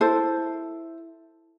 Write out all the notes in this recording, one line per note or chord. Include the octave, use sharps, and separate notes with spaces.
E4 A4 C5